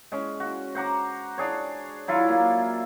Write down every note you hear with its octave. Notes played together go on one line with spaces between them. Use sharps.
G#3 C#4
F#4
C5 F#5 A#5 D6
D4 G#4 C#5
F#3 E4 F4
A#3